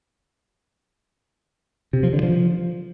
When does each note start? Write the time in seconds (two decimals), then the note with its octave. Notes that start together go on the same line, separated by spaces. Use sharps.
1.93 C3
2.03 F3
2.13 D3
2.23 F3